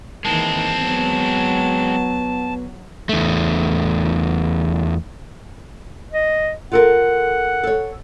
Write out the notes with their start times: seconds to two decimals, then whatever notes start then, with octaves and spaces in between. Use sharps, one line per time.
0.25 D#3 E3 G#3 A#3 C4 A5
0.81 F#3 B3
3.09 E2 A3
6.12 D#5
6.72 F4 A4 A#4 F#5
7.63 A4 C#5